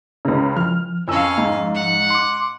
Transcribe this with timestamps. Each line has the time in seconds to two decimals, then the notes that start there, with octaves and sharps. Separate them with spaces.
0.25 C#2 C#3
0.57 F3 F6
1.08 F2 C#4 F5 E6
1.38 G#2
1.75 F#5
2.10 C6 D6